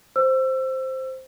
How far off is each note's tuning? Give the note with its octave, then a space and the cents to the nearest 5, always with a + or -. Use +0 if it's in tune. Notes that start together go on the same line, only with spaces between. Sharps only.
C5 +0 E6 +25